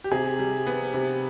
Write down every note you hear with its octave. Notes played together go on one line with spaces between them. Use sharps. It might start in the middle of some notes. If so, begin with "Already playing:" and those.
G4
C3 G#4
G3
B3
C3